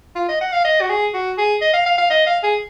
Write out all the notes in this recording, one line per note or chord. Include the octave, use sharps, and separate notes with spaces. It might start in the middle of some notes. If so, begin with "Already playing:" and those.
F4
D#5
F#5
F5
D#5
F#4
G#4
F#4
G#4
D#5
F5
F5
F5
D#5
F5
G#4